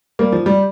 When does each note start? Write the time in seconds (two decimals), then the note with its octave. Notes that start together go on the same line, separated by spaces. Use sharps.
0.19 G3 A#3
0.32 F3
0.46 G3